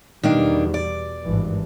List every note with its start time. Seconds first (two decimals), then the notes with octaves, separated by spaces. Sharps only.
0.23 E2 B2 D#3 G3 A#3 D4
0.74 D5
1.25 G#1 G2 E3